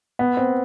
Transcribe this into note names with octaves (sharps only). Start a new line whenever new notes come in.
B3
C4